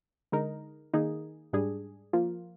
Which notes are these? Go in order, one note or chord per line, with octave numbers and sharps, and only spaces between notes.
D3 G#3 D#4 A#4
D#3 A#3 D#4 G#4
G#2 G3 D4 G#4
F3 A#3 F4